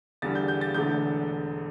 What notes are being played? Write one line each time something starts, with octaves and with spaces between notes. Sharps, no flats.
E2 D3 G3 A6
G6
G6
A6
E1 E2 D3 A3 G6